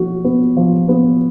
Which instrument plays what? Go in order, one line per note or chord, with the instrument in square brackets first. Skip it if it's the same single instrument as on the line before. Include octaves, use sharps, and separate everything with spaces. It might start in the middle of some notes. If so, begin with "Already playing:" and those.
Already playing: [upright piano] F3 F#4
B3
F3
B3